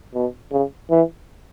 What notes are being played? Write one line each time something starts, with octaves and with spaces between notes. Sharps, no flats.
B2
C#3
E3